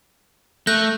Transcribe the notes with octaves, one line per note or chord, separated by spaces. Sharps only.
A3 F#6 G6 A#6